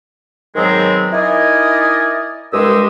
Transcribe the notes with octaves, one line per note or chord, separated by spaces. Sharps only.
G#2 D#3 F#3 G#3 B3 C4
D#4 E4 A#4 D5 D#5 G#5
C2 G2 G#3 G4 D#6 E6